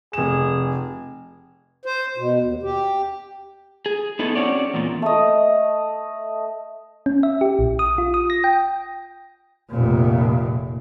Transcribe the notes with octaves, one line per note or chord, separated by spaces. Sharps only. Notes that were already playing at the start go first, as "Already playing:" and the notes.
F1 G#4 E7
C5
B2
D#2
G4
G#4
B3 D#4 E4 G#4 A4
C4 C#4 F#4 C#5 D5
E2 A#2
A3 D#5
C#4
E5
G4
A#1
D#6
F4
D#6
A#6
G5
F1 A#2